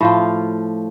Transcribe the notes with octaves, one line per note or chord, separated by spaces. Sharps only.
A2 F3 F4